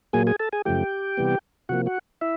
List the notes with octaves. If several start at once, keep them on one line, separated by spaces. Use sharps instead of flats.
A#2 F#3 A#3 G#4 G#5
G#4 G#5
A4 A5
G#4 G#5
F#2 C#3 F3 A3 G4 G5
C3 E3 G3 B3
C3 F3 A#3 F#4 F#5
F#4 F#5
E4 E5